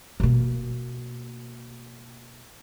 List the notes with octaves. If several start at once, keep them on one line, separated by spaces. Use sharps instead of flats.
B2 A#3